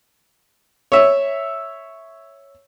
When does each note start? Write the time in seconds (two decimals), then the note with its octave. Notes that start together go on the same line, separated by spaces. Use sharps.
0.92 C#5 E5